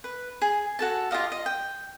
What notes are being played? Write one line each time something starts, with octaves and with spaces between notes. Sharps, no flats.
B4
G#4
F#4 A4 A5
F4 G4 D#5 F5
D#5
G5